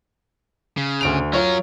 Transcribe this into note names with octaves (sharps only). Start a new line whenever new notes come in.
C#3
D2 D7 F7
F#3 F4 A#4 C#5